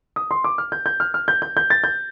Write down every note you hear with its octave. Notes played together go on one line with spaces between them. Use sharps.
D#6
C6
D6
F6
G6
G6
F6
F6
G6
G6
G6
A6
G6